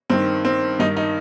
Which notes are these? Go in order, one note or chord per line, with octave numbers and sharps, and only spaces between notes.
G2 D#3 C4
C4
G2 D#3 D#4
D#4